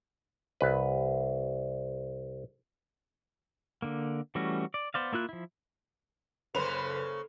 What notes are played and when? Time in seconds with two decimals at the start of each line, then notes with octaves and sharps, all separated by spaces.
0.61 C2 B4
3.82 D3 A#3
4.35 E3 G3 A3 C#4 F#4
4.74 D5
4.94 B3 C5 D5 F5
5.13 A#3 E4 F4 F#6
5.29 F3 E4
6.55 F#1 C#3 A#3 A4 B4 C5 F7